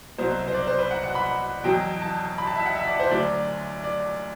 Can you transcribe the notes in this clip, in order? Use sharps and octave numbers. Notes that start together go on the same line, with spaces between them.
C2 B2 F#3 C5
C5
D5
C5
B4
F#5
F#5
B5
E2 B2 F#3 G5
A5
B5
A5
E5
F#5
E5
D5
C5
D2 D3 F#3 D5
D5